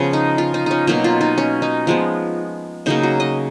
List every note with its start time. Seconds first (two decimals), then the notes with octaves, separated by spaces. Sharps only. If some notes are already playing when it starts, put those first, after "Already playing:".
Already playing: C#3 F3 B3 C#4
0.13 D#4
0.38 F4
0.54 D#4
0.66 C#4 D#4
0.87 B2 F#3 A#3 D#4
1.04 F4
1.21 D#4
1.38 C#4
1.62 D#4
1.87 F3 G#3 B3
2.86 C#3 F#3 A#3 D#4
3.03 F#4
3.20 D#5